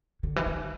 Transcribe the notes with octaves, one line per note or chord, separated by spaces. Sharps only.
D3
E3
D#3